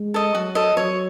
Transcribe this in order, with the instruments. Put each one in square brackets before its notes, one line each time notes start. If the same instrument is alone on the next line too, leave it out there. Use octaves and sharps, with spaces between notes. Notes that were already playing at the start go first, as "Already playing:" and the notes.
Already playing: [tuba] G#3
[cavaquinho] A4 D#5
[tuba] F#3 [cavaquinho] F#4
[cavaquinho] A4 D#5
[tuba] F#3 [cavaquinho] C#5